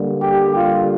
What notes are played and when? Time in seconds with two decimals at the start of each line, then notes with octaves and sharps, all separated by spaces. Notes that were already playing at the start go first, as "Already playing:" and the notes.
Already playing: D3 G3 A#3
0.19 G4
0.54 F4